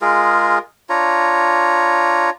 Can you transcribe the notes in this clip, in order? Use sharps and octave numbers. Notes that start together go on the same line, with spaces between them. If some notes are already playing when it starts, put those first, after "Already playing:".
G#3 F4 G#4 A#4
D4 F4 C#5 A#5